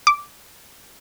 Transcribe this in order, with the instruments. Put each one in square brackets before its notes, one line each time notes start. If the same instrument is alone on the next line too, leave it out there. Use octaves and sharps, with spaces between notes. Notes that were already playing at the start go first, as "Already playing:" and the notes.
[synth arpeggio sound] D6